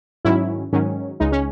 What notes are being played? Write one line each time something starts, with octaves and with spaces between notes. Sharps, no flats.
G#2 D#3 F#3 C#4 E4
G#2 D#3 F#3 C#4
C#2 C#3 G#3 D#4
C#4